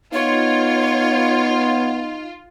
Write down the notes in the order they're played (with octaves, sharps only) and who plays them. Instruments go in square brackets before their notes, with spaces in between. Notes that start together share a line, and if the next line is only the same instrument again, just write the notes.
[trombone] B3 [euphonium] D#4 [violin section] F4 [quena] C#5